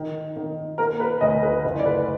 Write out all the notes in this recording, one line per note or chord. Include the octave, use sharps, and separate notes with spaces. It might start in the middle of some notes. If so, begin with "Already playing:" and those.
Already playing: D#3
D#3
A#3 A#4
B4
D2 D#5
B4
F#1
D5
B4